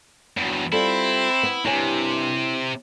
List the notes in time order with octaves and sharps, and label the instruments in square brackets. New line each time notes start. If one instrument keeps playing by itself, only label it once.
[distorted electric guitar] E2 G2 [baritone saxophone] F#3
[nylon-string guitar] G3 F4 A4 [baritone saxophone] C4 [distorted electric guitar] E4
[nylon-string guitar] B3
[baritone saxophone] G2 [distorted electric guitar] C3 [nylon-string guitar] E4 C#5 G#5